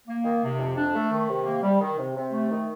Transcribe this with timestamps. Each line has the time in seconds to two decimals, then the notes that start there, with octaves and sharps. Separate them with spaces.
0.08 A#3
0.24 D#3
0.43 C3
0.59 F2
0.76 D4
0.94 A3
1.11 D#3
1.28 C3
1.45 A#3
1.62 G3
1.80 D#3
1.98 C3
2.15 C3
2.32 A3
2.50 D#3